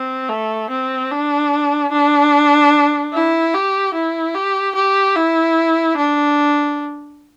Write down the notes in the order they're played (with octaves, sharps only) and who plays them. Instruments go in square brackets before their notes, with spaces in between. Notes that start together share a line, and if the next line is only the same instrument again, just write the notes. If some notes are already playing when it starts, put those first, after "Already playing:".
Already playing: [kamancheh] C4
A3
C4
D4
D4
E4
G4
E4
G4
G4
E4
D4